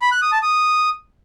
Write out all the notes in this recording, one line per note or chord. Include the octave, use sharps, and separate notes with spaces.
B5
F#6
D#6
A5
D#6